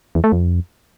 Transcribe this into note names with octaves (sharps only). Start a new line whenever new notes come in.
E2
A3
F2